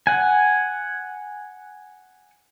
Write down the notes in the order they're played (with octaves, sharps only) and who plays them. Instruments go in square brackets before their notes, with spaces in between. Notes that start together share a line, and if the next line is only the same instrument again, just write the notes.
[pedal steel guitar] F#5 G#5